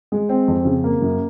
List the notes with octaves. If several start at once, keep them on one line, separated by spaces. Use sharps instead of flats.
G#3
C4
F2
C#3
A#3
F#2